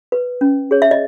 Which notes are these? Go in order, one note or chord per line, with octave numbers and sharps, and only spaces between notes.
B4
C#4
G#4 C#5
E5
D#5